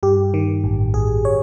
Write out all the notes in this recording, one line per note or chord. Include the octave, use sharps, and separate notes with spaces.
G2 G4
D#3
A1
A1 G#4
C#5